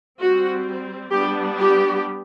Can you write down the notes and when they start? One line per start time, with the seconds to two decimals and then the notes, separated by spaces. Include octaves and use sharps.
0.20 G3 C4 F#4
1.12 G3 B3 D4 G4
1.57 G4